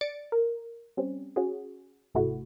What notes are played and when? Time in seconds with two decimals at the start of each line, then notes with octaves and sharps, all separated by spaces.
0.01 D5 A6 C#7 D7
0.32 A#4
0.97 G3 C4 C#4
1.36 C#4 F#4 G#4
2.14 G#1 C3 A3 E4 F#4